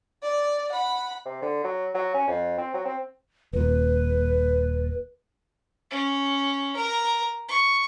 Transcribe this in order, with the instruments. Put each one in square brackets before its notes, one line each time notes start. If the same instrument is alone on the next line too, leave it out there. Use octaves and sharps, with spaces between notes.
[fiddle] D5
F#5 B5
[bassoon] C3
D3
F#3
F#3
C#4
F2
C4
F#3
C4
[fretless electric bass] D#1 A#2 [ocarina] B4
[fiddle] C#4
A#4
C#6